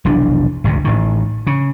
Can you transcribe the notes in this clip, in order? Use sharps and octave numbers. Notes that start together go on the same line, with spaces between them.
F1 B1 E3 D4
G#1 D2 A2 C3
A1 A2 D#3
C#3